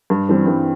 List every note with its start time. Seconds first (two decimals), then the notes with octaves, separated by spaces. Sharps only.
0.10 G2
0.29 E3 G3 C4
0.47 G2